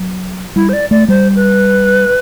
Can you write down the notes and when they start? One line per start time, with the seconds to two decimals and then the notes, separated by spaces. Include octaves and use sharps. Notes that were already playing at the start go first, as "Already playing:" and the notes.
Already playing: F#3
0.56 G3 E4
0.69 C5
0.73 D5
0.91 A3 D5
1.08 G3 C5
1.36 B4